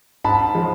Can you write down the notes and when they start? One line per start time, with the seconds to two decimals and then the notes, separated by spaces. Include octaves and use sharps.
0.24 G#2 A5 B5
0.55 F3 G#3